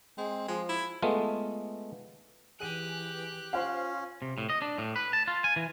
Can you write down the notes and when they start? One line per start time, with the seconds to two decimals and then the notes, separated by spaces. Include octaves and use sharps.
0.18 G#3 C4
0.48 F3 G#3
0.69 E4
1.02 G#3 A3 B3 F4
2.60 E3 G4 G#4 F#6 D#7
3.53 C#4 F4 C5 F5
4.22 C3
4.38 A2
4.50 D#5
4.62 D4
4.78 A2
4.96 B4
5.13 A5
5.28 F4
5.44 G#5
5.56 E3